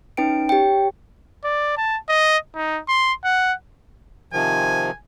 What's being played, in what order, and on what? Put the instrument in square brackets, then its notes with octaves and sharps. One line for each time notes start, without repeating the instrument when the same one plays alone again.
[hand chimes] C#4 D#4 B4 G5 D7
G4 C#5 G5
[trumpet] D5
A5
D#5
D#4
C6
F#5
[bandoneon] C3 D#3 F3 [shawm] G#5